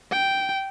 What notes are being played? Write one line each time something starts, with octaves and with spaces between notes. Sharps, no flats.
G5